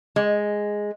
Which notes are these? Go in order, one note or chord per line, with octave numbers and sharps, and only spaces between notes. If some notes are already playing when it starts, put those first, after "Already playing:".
G#3